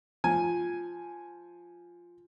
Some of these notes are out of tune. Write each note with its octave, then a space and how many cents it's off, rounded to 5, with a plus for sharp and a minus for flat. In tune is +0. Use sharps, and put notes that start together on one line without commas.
F3 +0 G#5 +0